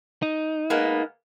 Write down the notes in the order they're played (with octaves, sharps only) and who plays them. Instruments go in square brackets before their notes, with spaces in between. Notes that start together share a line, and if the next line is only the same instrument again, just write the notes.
[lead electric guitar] D#4
[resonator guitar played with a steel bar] G#3 A#3 B3